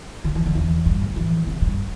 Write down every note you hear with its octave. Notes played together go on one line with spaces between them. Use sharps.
D3
E3
D3
E2
G2
A2
E3
C3
G2